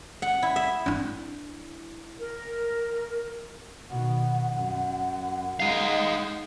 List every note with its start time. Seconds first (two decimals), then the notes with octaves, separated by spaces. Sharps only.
0.22 F#5
0.43 E4
0.56 E5
0.86 D4 E4
2.19 A#4
3.90 B2 D#3 F#5
4.54 F#2
5.60 G#3 D#4 F5